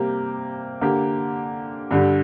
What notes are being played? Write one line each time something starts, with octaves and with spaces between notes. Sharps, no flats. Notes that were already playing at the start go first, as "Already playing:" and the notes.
Already playing: C3 G3 A#3 G4
D3 A#3 G4
G2 D3 G3